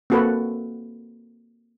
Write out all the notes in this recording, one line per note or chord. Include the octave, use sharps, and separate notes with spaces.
A#3 C4 F#4 A4 B4